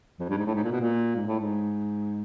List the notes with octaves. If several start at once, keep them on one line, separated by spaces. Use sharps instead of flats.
F2
G2
G#2
A2
G#2
A#2
B2
A#2
G#2
A2
G#2